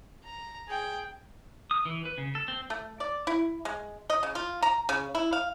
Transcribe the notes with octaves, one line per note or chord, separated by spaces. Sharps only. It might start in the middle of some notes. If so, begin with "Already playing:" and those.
A#5
G#4 G5
D#6
E3
B4
C#3
A4
C4
A3
D5
E4
G#3
D#5
C#3
F4
A#5
C#3
E4
F5